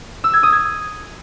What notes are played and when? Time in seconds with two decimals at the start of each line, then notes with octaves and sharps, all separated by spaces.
0.24 E6
0.33 G#6
0.43 D#6
0.53 G#6